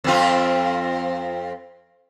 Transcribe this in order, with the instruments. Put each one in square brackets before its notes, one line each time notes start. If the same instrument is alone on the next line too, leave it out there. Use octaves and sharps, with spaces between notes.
[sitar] F2 C4 F4